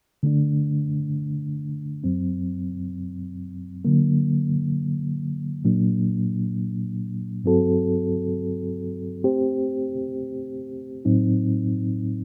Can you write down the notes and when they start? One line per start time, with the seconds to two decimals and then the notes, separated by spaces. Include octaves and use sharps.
0.23 D3 A3 D4
2.04 F#2 F#3 C4
3.85 D3 F#3 A#3
5.64 A#2 F#3 A#3 D4
7.44 G2 F#3 C4 F#4 A4
9.24 A3 C4 G4 C5
11.05 A2 F#3 C4 D#4